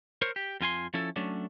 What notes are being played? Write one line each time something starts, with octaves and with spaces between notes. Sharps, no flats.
A#4 C5 C#5
G4
F2 F4 G#5 C6
F3 C#4 E4 A4
F#3 A3 C#4 D4